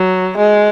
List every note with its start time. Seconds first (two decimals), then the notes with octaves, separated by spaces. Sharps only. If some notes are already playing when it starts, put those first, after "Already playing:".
Already playing: F#3
0.37 G#3